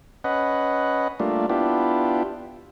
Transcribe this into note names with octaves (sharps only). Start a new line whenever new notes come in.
C#4 B4 D#5 F#5
G3 A3 A#3 D4 F4
B3 D4 E4 F4 G4